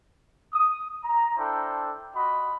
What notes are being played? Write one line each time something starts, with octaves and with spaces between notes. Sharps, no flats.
D#6
A#5
D4 E4 A4 C5 G5
F4 F#4 D#5 B5